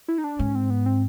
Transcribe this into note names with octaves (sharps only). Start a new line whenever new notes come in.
E4
D#4
D4
G#2 C#4
C4
B3
C4